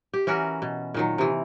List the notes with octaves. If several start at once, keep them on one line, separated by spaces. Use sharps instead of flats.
G4
E3 C#4 F#4 A#4
B2
A#2 D#3 F#3
C3 E3